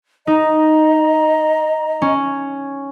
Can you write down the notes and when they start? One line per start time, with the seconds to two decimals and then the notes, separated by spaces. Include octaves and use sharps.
0.27 D#4 D#5 A#5
2.02 C#4